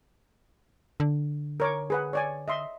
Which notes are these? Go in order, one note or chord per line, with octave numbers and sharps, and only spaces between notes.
D3
A#4 C#5 D6
G#4 B4 F#5
C#5 D5 G#5
D#5 E5 C6